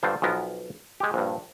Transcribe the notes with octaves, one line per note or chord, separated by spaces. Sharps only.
G2 D3 F4 C5
B1 F3 B3 A#4
G#3 G4
A#1 G2